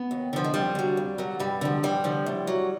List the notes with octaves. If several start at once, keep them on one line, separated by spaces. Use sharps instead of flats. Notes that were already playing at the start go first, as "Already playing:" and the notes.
Already playing: B3
D#2
D3 F3
G#3
F2 G3
D3 F#3
F2
D3 F#3
G2 G3
D3 F3
G2 G3
D3 F3
A2
F#3